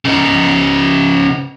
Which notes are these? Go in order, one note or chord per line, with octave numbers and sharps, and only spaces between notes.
C#3 D#4